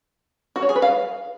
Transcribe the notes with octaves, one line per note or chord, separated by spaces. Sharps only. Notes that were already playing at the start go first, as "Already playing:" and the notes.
F#4
C#5
G#4
B4
F5